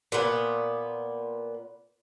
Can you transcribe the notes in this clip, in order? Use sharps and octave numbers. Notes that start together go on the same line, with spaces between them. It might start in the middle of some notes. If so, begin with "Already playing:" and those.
A#2 B3